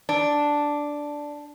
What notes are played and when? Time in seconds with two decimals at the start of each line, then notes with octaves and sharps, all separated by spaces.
0.09 D4